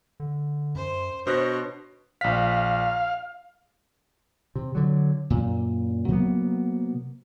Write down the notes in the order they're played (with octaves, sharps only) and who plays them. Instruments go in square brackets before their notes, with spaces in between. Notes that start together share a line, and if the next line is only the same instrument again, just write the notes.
[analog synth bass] D3
[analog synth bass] F#2 [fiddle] C5
[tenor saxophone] B2 [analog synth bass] D4 [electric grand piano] C5 F#6 A#6 [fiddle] C#5
[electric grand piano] A#1 B6 [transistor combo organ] F5
[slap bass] C3
D3 F#3
F#2 A#2
C3 F#3 A#3 B3